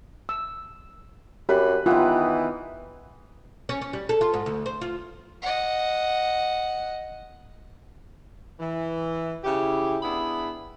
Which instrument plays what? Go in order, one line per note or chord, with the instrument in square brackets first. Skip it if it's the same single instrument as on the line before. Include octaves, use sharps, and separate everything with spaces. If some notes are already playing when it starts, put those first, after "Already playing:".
[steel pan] E6
[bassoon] F#2 [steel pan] G4 [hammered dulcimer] B4 B5
[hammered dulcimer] D#3 B3 [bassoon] E3 [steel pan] F4
[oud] C#4
C#4
G3
A4
F4
G#2
D2
C5
F4
[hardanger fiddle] D#5 F#5
[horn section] E3
C#3 E4 G4
B3 D4 E4 G#4 B5